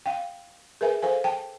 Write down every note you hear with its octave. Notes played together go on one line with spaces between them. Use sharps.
F5 G5
G#4 A#4 B4 E5 G#5
A4 C5 F5 G#5
G5 A5